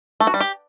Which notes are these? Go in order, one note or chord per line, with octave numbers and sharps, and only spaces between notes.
A3
F#4
G3
G4